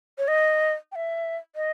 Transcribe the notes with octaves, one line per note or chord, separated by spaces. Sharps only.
C#5
D#5
G5
E5
D#5